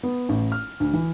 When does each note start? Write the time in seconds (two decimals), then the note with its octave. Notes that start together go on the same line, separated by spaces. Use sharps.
0.03 B3
0.29 A1
0.52 F6
0.80 D2
0.94 E3